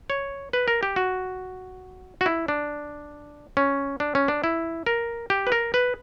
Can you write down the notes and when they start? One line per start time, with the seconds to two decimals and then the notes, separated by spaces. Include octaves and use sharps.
0.10 C#5
0.53 B4
0.68 A#4
0.83 G4
0.96 F#4
2.21 F#4
2.26 E4
2.48 D4
3.57 C#4
4.00 D4
4.15 C#4
4.28 D4
4.44 E4
4.86 A#4
5.30 G4
5.47 B4
5.52 A#4
5.74 B4